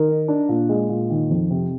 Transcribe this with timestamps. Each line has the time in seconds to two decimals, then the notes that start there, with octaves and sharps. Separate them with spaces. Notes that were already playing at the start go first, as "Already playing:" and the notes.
Already playing: D#3 A#4
0.09 D#4
0.28 D4
0.49 A#2
0.69 G#3
0.89 A#2
1.10 D#3
1.30 F2
1.51 C3